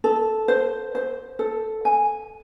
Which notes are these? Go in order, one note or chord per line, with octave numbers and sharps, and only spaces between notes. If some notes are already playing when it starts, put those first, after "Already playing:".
A4
C5
C5
A4
G#5